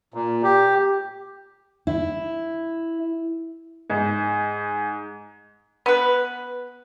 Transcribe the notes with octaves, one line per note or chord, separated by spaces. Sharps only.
A#2
G4
E4
G#2
B3 B4